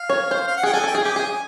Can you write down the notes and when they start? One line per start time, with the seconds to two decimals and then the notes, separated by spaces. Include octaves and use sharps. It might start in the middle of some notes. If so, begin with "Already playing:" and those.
Already playing: F5
0.10 C#5
0.31 C5
0.47 F5
0.57 F#5
0.63 G#4 G5
0.73 A4 G#5
0.84 A4
0.87 G5
0.95 G#4
1.02 G4 G#5
1.16 G#4